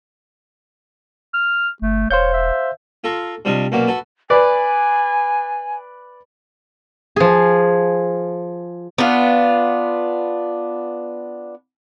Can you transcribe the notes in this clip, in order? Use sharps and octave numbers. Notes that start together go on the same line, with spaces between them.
F6
G1 A3
E1 C5 C#5 F5 G6
E5
F4 A4 A#5 C#6
C3 G3 D4 F4 D#5 C#6
F#2 B2 A#3 F#4 D5
F#4 A4 B4
B4 D5 G#5
F3 G#4
B3 D4 F4